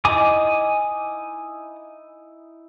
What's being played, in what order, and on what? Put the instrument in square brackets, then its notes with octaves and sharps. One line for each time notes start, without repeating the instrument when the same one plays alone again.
[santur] D#4 E4 D#5 [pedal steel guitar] G#5 D6 D#6